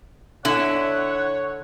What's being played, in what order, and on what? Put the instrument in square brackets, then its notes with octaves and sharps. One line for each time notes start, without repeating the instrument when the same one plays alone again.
[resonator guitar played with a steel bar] D3 [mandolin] E4 [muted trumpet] C#5 [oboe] F#5